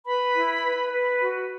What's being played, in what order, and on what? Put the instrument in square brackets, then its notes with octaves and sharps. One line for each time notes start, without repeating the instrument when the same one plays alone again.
[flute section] B4 B5
E4
B4
B4
F#4